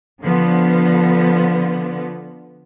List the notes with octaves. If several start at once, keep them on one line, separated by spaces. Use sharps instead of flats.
D3 F3 B3